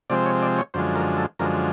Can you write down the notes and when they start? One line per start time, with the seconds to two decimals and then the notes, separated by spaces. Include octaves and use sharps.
0.10 C3 F3 G#3 C4 D5
0.26 C#5
0.42 D5
0.58 C#5
0.74 F#2 D3 F3 G#3 C5
0.96 A#4
1.17 A4
1.39 F#2 D3 F3 G#3 A#4